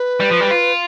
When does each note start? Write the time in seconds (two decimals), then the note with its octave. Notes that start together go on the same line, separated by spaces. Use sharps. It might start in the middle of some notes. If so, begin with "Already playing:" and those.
Already playing: B4
0.20 G3
0.31 F3
0.40 G3
0.51 F4